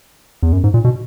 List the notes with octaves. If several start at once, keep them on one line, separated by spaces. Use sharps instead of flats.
E2
F#2
G#2
A#2
B2